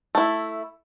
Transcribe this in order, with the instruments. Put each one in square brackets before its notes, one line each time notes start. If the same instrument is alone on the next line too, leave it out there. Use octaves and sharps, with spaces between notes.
[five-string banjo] A3 E4